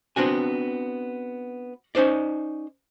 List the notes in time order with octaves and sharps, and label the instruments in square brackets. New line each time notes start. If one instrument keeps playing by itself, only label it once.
[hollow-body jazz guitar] B3 C4 D4 F#4 G#5
C#4 D#4 C5 D5